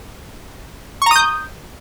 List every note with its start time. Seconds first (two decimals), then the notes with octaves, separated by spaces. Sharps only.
1.02 C#6
1.06 A#5
1.11 D#6
1.16 G6